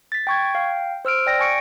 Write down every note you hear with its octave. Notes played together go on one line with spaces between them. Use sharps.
A6 B6
G5 C#6 G#6
F5 G5
C5 E6 F6 D7
D5 G5 A#6
G#5 C#6 C#7 D7